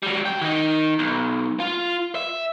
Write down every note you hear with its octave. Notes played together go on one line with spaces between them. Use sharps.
F#3 G3
C3 G5
D#3 D#4
B1
F4
E5